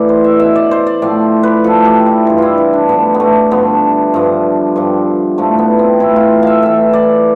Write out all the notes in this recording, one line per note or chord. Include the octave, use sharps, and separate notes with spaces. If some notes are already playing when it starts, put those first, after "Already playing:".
Already playing: A2 E3 D5
C5
E5
B2 E5
D5
C5
D5
A2 F3 D5
B4
A2 F3 A4
G4
E4
G2 E3 F4
E4 F4
E4
D4
A2 F3 B3
B3
A3
G2 D3 F3 B3
G2 F3
G2 F3
A2 F3 A3
B3
C4
A2 E3 E4
F4
E5 F5
A2 E3 E5
D5